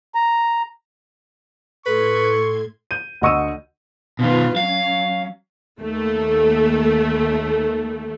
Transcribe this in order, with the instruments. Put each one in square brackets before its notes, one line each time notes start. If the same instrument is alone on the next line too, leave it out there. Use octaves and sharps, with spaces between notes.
[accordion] A#5
[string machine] A2 C6 G#6 [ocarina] A4 [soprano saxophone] B4 [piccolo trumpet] C#6
[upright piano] G6 D#7
D2 D3 D#5 C#6 E6 D#7
[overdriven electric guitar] B2 D#3 [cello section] F4 B4
[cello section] F#3 C#4 [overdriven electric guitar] F5
[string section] D#2 A3